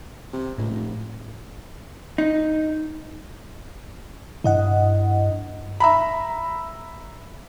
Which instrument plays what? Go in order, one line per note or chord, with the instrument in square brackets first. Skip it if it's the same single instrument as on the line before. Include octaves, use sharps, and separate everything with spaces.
[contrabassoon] C3
[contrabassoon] C#2 [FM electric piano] A2
[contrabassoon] F1
[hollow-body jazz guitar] D#4
[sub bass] G2 [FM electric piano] E4 D#5 F#5
[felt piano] E5 A#5 B5